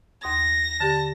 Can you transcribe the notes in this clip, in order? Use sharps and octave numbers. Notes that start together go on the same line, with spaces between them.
D#2 C6 D#6 A#6
D3 G4 A5